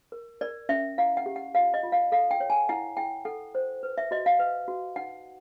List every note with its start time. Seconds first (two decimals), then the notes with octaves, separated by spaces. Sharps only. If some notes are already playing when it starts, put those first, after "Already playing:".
0.12 A#4
0.41 A#4 D5
0.69 C#4 E5
0.98 E4 F5
1.17 F#5
1.26 G4
1.36 F#5
1.55 F4 F5
1.74 D#5
1.83 F4
1.92 F5
2.12 A4 F5
2.31 G5
2.40 C#5
2.50 G#5
2.69 E4 F#5
2.97 E4 G5
3.25 A4 F#5
3.55 C5
3.83 B4
3.98 E5
4.11 F#4 D#5
4.26 F5
4.39 B4
4.68 F#4
4.96 D#4 F#5